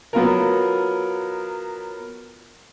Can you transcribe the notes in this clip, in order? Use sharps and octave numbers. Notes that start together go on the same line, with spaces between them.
F#3 B3 F4 A#4